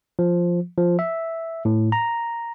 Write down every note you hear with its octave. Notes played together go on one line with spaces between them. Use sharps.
F3
F3
E5
A2
A#5